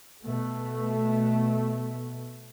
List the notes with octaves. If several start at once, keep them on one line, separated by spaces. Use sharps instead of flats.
B2 A3